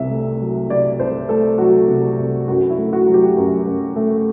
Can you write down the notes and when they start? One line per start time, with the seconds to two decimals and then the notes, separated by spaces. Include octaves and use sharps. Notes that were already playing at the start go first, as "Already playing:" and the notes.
Already playing: C2 C3 E5
0.10 A3
0.41 F#3
0.69 C3 D5
1.00 C2 C5
1.29 A3 A4
1.58 F#3 F#4
1.88 C3
2.19 C2
2.48 F#2 F#4
2.70 E4
2.78 A3
2.93 F#4
3.07 F#3
3.14 G4
3.37 F#2
3.66 F#2
3.96 A3